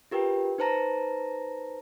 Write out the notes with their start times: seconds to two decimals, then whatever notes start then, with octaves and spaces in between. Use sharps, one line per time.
0.11 F4 G4 A#4 B4 G5
0.58 D#4 B4 C5 A5 A#5 A#6